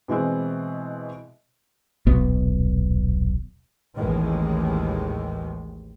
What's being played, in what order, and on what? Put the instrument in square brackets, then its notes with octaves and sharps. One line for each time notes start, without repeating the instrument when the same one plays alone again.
[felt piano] B2 E3 G#3 C4
[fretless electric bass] D#1 B1 B2 B3
[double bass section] A1 D#2 A2 D#3 E3 G#3